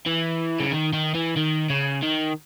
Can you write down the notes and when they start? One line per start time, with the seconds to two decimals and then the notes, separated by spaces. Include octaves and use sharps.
0.06 E3
0.60 C#3
0.71 D#3
0.93 D#3
1.15 E3
1.37 D#3
1.70 C#3
2.02 D#3